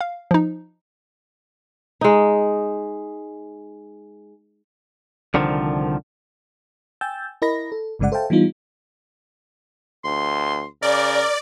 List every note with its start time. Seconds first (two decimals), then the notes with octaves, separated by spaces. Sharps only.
0.01 F5
0.31 F3 D#4
2.01 G#3 D#4
5.34 C2 D3 D#3 F3
7.01 G5 G#5 E6 G6 A6
7.42 E4 A#4 D#5 B5 A#6
7.72 A4
7.99 G1 G2 C#3 G#3 D5 F#5
8.12 A4 C5 E5 F5 G5 A5
8.30 E3 G3 B3 D#4 F4
10.04 D2 C6
10.82 C#3 A#4 D5